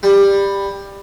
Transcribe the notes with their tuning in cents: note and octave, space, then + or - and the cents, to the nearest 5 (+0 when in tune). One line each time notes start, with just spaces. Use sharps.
G3 +15